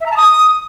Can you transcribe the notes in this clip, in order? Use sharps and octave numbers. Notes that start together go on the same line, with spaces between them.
E5
A#5
A5
D#6